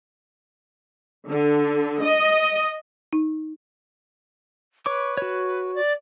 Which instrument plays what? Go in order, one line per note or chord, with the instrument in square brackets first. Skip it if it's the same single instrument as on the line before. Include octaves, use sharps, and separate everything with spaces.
[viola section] D3
D#5
[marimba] D#4
[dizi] B4 [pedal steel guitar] C#5 C#6 D6
[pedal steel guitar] F#4 C#5
[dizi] D5